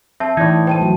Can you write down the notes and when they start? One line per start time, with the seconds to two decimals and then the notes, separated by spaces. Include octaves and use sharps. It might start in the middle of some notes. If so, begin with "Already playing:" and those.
0.20 C4 E5 A5
0.37 A2 E3 D#4 D5 D#6 G#6
0.67 A3 C5 G5 A5 D#7
0.82 F#3